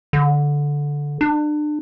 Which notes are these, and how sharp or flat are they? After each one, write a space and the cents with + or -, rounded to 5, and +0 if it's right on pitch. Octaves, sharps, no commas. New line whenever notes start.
D3 -10
D4 +35